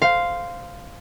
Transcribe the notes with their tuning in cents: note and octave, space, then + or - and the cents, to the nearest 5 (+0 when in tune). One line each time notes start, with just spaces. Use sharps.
C5 -10 F5 +0